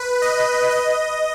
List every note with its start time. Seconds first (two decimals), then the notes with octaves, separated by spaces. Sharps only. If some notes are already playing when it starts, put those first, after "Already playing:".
Already playing: B4
0.22 D#5
0.71 D#5